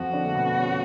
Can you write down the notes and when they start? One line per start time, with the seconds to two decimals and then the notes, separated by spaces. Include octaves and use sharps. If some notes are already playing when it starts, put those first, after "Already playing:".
Already playing: F2 F3 F#4
0.13 D3 D4
0.25 A3
0.35 B2 B3
0.45 B3
0.57 C#3 C#4